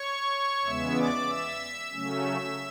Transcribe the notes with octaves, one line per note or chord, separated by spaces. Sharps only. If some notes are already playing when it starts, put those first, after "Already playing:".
Already playing: C#5 C#6
E2 C#3 G#3 B3 E5 E6
D5 D6
E5 E6
C#3 F#3 A3 C#4